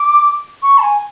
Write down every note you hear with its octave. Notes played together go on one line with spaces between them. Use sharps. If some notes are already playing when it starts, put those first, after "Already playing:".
Already playing: D6
C#6
A5
G#5